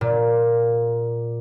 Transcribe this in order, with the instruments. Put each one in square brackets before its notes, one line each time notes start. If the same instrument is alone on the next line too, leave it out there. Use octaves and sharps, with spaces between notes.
[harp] A#2